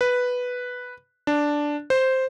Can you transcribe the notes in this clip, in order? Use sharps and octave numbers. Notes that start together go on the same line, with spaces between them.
B4
D4
C5